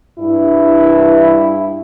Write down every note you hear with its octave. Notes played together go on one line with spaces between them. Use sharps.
G2 E4